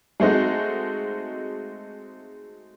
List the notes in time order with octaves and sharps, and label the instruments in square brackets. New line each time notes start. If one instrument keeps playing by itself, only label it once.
[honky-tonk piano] G#3 A3 C4 D#4 F#4